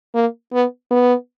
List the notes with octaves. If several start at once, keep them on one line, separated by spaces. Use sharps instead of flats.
A#3
B3
B3